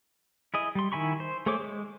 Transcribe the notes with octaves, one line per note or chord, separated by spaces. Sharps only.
E4 G#4 D#5
G3 C6
D#3 E4 G#5 B5 C#6
C5
A3 G#4 C5 C#5 D6
G#3